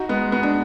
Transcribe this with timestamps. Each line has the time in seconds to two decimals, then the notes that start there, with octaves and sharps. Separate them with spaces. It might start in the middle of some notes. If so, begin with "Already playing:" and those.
Already playing: D#4 F#4
0.09 G#3 B3
0.32 B3
0.43 D4